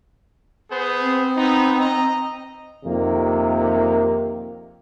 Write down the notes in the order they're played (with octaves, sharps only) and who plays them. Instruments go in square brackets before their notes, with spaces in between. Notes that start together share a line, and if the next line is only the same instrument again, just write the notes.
[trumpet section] B3 G#4 C5
[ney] C4
[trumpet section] B3 D#4
D#5 A#5
[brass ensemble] F2 C3 D#3 A#3